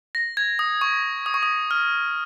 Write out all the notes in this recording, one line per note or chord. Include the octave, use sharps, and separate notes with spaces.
A#6
G#6
D#6
C#6
D#6
C#6
D#6
F6